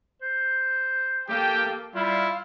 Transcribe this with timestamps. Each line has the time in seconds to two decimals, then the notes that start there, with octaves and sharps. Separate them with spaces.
0.22 C5
1.28 A#3 G4 A4 G5
1.95 G3 E4 F4 F5